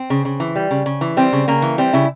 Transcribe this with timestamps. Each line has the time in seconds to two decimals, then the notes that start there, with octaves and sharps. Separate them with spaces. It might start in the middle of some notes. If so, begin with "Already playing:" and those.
Already playing: C4
0.10 C#3
0.25 C#3
0.40 E3
0.56 G3
0.71 C#3
0.86 C#3
1.01 E3
1.17 G3 C4
1.32 C#3
1.48 C#3 A#3
1.62 E3
1.78 G3 C4
1.93 C#3 E4